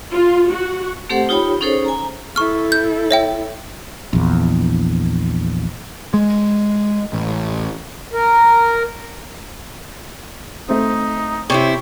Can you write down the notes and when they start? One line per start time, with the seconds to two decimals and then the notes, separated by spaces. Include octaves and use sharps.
0.13 F4
0.51 F#4
1.09 A3 C4 G4 A4 C5 F#5
1.29 D#4 F4 G4 C#5 G5 B5
1.61 C#4 D#4 G#4 A4 C5 C#5
1.85 G#5 A#5
2.36 E4 A4 C#6 F6
2.72 G6
3.11 C#5 E5 G5
4.13 A#1 E2
6.14 G#3
7.13 A1
8.13 A#4
10.69 A3 C4 D#4
11.50 C3 C4 E4 C#5